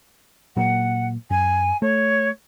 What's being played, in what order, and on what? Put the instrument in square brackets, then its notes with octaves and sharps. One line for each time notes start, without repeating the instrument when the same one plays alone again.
[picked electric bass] A#2 F#3 A#3 [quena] F#5
[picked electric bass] F#2 [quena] G#5
[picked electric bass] A3 [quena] C#5